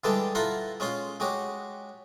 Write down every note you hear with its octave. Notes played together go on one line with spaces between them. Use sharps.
D3 E3 G3 G#3 G5 A5
E4 F4 A4 F#5 A#5 C6
G#3 C#4 F4 C6
G#3 F#4 G4 C#5